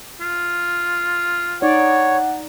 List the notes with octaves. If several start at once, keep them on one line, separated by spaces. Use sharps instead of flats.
F4
D#4 C#5 D5 F#5